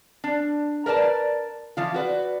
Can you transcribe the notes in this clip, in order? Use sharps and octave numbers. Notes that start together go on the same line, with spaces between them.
D4
A#4 B4 D5 A5
E3 F3 F4
F#4 B4 D5